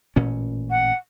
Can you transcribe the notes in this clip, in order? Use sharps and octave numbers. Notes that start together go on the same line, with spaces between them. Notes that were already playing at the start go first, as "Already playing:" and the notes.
A1 A#2 C#4
F#5